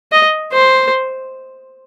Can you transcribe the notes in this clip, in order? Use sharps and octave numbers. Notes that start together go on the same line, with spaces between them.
D#5
C5